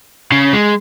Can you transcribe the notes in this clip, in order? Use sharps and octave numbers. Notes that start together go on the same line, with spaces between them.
C#3
G#3